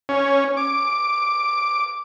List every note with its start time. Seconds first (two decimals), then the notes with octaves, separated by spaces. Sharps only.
0.09 C#4
0.57 D6